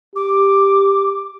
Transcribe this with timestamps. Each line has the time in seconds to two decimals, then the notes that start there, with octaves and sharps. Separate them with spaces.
0.16 G4 D6